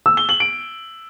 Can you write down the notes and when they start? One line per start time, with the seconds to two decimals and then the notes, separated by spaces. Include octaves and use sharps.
0.06 E6
0.17 G7
0.29 F#7
0.40 D7